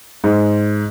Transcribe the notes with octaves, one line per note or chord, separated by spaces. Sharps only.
G#2